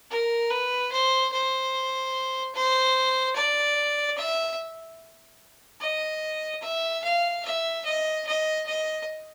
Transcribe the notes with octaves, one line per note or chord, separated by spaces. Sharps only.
A#4
B4
C5
C5
C5
D5
E5
D#5
E5
F5
E5
D#5
D#5
D#5